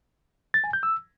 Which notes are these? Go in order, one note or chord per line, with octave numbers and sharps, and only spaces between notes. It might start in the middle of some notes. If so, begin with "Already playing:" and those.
A6
G#5
G6
E6